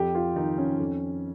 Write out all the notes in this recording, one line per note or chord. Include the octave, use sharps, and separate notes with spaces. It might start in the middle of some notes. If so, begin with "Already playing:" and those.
Already playing: F2 G4
F4
D#3 D#4
C#4
F2